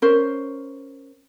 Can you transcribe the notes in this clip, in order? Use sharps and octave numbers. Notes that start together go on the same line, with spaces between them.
C#4 A#4 C5